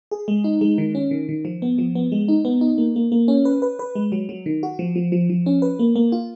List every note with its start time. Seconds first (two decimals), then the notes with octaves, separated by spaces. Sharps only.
0.11 G#4
0.28 G#3
0.44 D#4
0.61 G#3
0.78 D#3
0.95 C#4
1.11 D#3
1.29 D#3
1.45 F3
1.62 B3
1.78 F3
1.95 B3
2.12 G#3
2.28 D#4
2.45 B3
2.61 D#4
2.78 A#3
2.96 A#3
3.12 A#3
3.28 C#4
3.45 B4
3.62 B4
3.79 B4
3.95 G#3
4.12 F#3
4.29 F#3
4.46 D#3
4.63 F#4
4.79 F3
4.95 F3
5.12 F3
5.29 F3
5.46 C#4
5.62 B4
5.79 A#3
5.96 A#3
6.12 F4